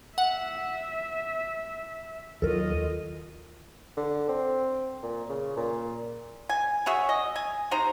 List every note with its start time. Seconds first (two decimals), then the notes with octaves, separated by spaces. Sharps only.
0.18 E5 F#5
2.42 D#2 F#3 F4 A4 A#4 D#5
3.97 D3
4.29 C4
5.03 A#2
5.29 C#3
5.57 A#2
6.49 G#5
6.86 C#4 F#4 G#4 E5
7.09 D#5
7.36 G#5
7.71 C3 D#4 C5 A#5